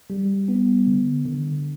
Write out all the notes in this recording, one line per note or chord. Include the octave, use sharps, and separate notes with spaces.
G3
B3
D3
D3